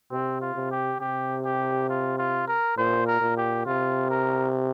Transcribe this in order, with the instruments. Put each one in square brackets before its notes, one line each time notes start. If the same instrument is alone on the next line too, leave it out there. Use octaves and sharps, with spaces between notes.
[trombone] C3 [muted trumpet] C4
[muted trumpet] F4
[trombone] C3
[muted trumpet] G4
[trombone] C3 [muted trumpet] G4
[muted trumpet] G4
F4
F4
A#4
[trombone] A#2 [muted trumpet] C5
[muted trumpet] A#4
[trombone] A#2
[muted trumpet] G4
[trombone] C3 [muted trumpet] F4
[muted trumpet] A#4